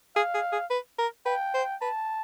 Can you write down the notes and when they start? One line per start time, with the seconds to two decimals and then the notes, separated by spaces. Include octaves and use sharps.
0.16 G#4 F5
0.35 G#4
0.52 G#4
0.70 B4
0.99 A#4
1.26 B4 G5
1.54 C5
1.81 B4 A5